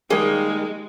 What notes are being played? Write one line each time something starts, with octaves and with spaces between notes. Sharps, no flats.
D#3 G3 G#3 A#3 G#4